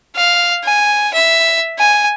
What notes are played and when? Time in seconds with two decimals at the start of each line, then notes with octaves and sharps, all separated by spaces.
0.16 F5
0.64 G#5
1.14 E5
1.78 G#5